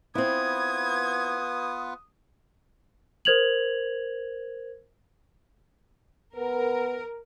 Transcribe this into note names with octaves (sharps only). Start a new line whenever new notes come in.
B3 C4 E4 F4 B4 D#6 G#6
A#4 C5 G#6 F7 F#7
B3 A#4